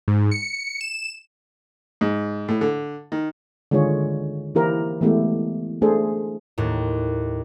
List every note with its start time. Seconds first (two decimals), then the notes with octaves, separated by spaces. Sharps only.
0.08 G#2
0.32 C#7
0.81 E7
2.01 G#2
2.48 A2
2.61 D3
3.12 D#3
3.71 D3 D#3 G#3 F4 G#4 C#5
4.55 E3 A#3 E4 G4 A#4 C5
5.01 E3 G#3 A3 B3 G4
5.82 A3 D4 G#4 A4 C5
6.58 D#2 A2